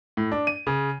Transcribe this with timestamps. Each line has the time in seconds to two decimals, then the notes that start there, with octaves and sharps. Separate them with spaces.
0.17 A2
0.32 D4
0.47 D#7
0.67 C#3